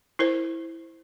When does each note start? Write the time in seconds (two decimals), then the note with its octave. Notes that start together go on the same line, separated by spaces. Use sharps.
0.19 E4 A#4 C5